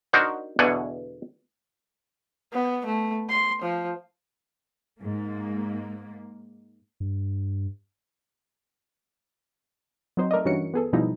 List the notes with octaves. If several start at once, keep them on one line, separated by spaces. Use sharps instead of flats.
D4 D#4 F#4 A#4 C5
E2 B2 D3 D4 F#5 G#5
B3
A3
C6
F3
G#2 A#3
G2
F#3 C4 D#4 C5
A3 A#4 D5 D#5
G2 E3 C#4 F#4 C#7
B3 G#4 A4
G#2 B2 F3 G3 D#4 E4